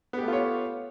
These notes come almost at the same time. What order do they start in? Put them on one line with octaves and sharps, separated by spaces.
B3 G4 A3 F4 C#5